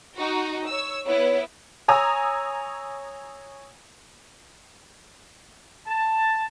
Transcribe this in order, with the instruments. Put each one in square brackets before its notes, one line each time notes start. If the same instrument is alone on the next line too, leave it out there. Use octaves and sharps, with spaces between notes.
[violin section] D#4 F#4
C#5 E6
[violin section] B3 E4 [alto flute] C#5
[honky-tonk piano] C#5 G#5 A#5 D#6 E6
[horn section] A5